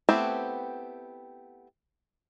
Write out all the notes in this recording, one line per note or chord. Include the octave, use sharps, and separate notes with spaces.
A3 B3 C4 E4 G4